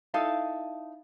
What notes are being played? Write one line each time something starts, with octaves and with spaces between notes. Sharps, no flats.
D#4 E4 A4 F5